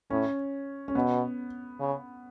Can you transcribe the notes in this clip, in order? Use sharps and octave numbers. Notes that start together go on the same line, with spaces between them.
A2 C#4
C#4
B2 B3
C#3